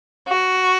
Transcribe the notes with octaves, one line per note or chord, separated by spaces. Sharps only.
F#4